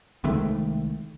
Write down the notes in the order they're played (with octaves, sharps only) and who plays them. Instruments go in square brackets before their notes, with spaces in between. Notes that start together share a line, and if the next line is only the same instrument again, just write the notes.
[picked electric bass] C2 D#3 G#3 A3